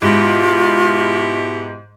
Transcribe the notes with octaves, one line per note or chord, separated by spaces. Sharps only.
G#2 B2 E4 F4 G4